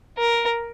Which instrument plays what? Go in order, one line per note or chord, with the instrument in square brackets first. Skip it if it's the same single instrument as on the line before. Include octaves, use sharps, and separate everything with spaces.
[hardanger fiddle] A#4